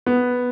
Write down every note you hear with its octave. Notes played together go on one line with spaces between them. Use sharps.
B3